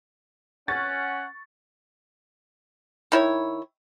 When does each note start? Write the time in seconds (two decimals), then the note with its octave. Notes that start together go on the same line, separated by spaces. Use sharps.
0.68 C#4 F#5 C#6 A6
3.12 D#3 E4 C#5